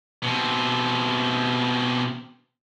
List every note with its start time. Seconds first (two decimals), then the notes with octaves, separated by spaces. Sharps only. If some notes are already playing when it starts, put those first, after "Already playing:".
0.23 B2 C4